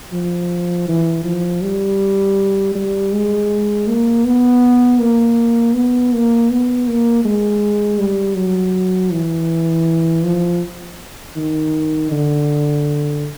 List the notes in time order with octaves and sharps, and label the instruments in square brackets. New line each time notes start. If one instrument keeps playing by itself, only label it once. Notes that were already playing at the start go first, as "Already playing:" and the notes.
[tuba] F3
E3
F3
G3
G3
G#3
A#3
B3
A#3
B3
A#3
B3
A#3
G#3
G3
F#3
E3
F3
D#3
D3